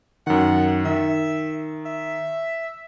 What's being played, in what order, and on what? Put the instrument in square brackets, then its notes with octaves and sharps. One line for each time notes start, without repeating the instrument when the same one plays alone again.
[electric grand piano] F#2 D#3 [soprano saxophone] F#5
[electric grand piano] D#3 [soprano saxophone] E5
[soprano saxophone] E5